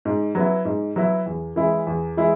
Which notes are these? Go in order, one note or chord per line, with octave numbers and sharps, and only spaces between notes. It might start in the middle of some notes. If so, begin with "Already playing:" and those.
G#2
F#3 B3 E4
G#2
F#3 B3 E4
E2
E3 G#3 E4
E2
E3 G#3 E4